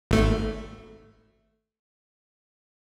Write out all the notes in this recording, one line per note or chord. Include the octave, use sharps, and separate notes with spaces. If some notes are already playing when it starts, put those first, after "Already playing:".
G#1 A3